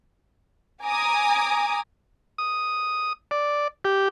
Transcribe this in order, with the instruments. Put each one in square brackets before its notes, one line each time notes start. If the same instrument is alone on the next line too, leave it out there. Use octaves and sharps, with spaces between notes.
[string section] G#5 A#5 D6 D#6
[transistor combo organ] D#6
D5
G4